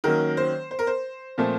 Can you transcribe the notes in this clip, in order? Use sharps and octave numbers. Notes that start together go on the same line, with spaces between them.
D#3 F#3 A#3 C#4 A#4
C5
C5
A#4
C5
A#2 F3 A3 C4